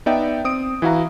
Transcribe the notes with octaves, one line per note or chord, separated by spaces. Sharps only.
B3 D#4 D5 E5 G5
C4 D#6 D7
E3 E4 F#4 F5 A#5